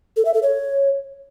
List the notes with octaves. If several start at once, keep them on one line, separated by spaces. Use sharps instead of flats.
A4
E5
A4
C#5